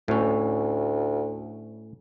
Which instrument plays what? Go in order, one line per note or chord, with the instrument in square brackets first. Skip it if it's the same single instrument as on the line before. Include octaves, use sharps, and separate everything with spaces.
[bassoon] D2 [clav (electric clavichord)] A2 C#4